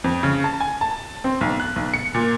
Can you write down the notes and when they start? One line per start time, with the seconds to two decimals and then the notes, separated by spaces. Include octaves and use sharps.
0.04 F2
0.23 C#3
0.44 A5
0.60 G#5
0.81 A5
1.24 C4
1.41 B1
1.60 F#6
1.76 B1
1.94 C#7
2.14 A#2